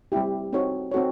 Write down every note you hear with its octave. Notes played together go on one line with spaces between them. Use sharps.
G3 C4 E4 G4
C4 D#4 F#4 A4 C#5
C4 D#4 F#4 A4 C#5